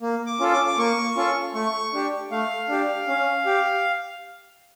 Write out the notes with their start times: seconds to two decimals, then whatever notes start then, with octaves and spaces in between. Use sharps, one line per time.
0.02 A#3
0.26 D6
0.40 C#4 F4 A4
0.52 D6
0.68 D6
0.78 A#3 C#6
1.16 C#4 F4 A4
1.54 A3 C#6
1.93 D4 G4
2.31 A3 F5
2.69 D4 G4
3.08 C#4
3.46 G4